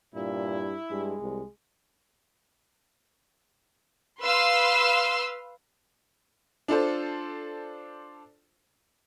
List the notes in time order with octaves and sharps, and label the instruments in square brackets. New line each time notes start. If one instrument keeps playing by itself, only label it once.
[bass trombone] G2 [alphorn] A#2 [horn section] E4
[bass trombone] G2 [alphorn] G#3
[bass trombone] C2
[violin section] B4 F5 C6 E6
[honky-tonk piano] D4 F4 A4 C5